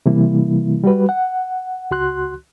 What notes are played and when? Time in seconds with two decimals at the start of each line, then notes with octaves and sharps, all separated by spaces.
0.06 C3 E3 G3 A#3 E4
0.84 G3 F#4 B4
1.09 F#5
1.91 C#2 F#4 C6 F#6